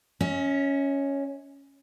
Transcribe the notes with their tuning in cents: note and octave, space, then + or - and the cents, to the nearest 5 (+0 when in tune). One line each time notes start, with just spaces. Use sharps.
C#4 +0 D#5 +45